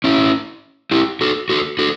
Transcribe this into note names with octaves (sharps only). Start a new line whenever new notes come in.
C#4 E4
E4 G4
F#4 A4
F#4 A4
F#4 A4